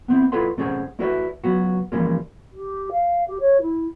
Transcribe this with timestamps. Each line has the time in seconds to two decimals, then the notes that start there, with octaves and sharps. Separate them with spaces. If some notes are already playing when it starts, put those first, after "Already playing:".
0.08 B3 C4 E4
0.32 E4 F4 A4 B4 F#5 C6
0.57 C2 A3 C#4 G#4 C5 F#5
0.99 A3 E4 F#4 B4 D5 E5
1.44 C#2 F#3 B3 F#4
1.92 C#3 E3 F3 G3 G#3 A#3
2.53 G4
2.92 F5
3.28 G4
3.40 C#5
3.61 E4